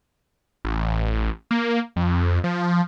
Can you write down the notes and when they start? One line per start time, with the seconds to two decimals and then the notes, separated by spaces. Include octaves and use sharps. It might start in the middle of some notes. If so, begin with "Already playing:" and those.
0.65 A1
1.51 A#3
1.96 F2
2.44 F3